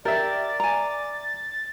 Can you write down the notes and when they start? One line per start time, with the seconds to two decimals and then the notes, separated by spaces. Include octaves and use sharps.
0.05 G4 A#4 D5 E5 A6
0.60 G#5 A#5